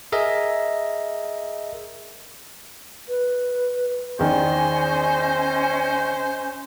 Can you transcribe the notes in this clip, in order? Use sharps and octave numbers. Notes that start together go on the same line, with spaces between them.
G#4 A#4 D#5 E5
B4
E2 D#3 C#4 C5 D#5 G#5